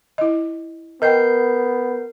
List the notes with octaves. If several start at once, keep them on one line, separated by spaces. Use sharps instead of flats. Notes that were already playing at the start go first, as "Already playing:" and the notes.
E4 D#5
B3 A#4 D#5 G5 G6 C7